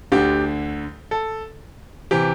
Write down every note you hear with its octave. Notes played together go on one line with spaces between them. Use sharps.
D2 D3 G4
A4
C3 E3 G4